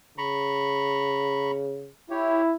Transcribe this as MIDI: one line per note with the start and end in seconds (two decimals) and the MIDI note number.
0.18 1.90 49
0.18 1.51 82
0.18 1.51 83
0.18 1.51 85
2.10 2.54 64
2.10 2.42 67
2.10 2.42 73